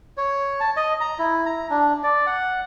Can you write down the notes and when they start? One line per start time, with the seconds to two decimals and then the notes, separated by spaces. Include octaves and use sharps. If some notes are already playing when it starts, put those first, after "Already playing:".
0.17 C#5
0.60 A5
0.77 D#5
1.01 A#5
1.19 E4
1.46 A#5
1.70 D4
2.03 D5
2.27 F#5